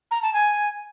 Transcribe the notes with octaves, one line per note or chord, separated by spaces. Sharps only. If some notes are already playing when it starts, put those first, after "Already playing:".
A#5
A5
G#5